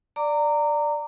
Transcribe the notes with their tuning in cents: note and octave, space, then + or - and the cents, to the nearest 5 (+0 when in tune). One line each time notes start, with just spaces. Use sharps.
D5 +0 A#5 -25 D6 +0